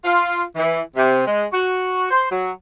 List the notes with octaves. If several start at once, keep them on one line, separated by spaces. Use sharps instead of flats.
F4
E3
C3
G#3
F#4
C5
F#3